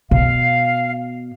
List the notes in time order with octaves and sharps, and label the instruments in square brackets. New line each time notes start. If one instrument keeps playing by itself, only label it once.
[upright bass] B2 [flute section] F5